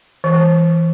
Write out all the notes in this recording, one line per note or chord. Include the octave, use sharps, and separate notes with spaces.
E3